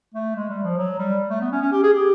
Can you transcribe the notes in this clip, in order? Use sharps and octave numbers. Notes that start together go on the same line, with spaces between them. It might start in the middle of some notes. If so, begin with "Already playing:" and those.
A3
G#3
G3
F3
F#3
G3
A3
B3
C#4
C#4
G4
G#4
G4